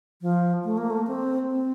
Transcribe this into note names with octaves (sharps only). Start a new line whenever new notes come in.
F3
A3
A#3
A3
C4
C4